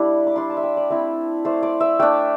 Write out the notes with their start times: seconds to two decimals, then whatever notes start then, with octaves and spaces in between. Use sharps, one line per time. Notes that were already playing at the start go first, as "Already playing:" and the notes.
Already playing: G3 D4 E4
0.27 D6
0.36 G3 D4 C6
0.50 A5
0.57 E5
0.63 G5
0.77 D5
0.90 A3 C4 E4
1.45 A3 D4 C5
1.63 D5
1.80 E5
1.99 A3 D4 G5